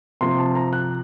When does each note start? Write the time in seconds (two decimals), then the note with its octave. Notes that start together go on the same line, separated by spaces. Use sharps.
0.21 C3 F3 C4 C6
0.39 A5
0.55 A#5
0.73 F#6